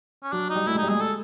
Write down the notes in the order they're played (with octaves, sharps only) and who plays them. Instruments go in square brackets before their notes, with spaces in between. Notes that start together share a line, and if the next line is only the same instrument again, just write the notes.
[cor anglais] C#4
[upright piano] F#3 [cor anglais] D4
[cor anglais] D#4
[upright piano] G3
[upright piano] A3 [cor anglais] E4
[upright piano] G#3 [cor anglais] D#4
[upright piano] G3
[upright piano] G#3 [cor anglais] G#4
[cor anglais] A4